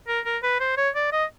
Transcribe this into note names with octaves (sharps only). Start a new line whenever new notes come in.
A#4
A#4
B4
C5
C#5
D5
D#5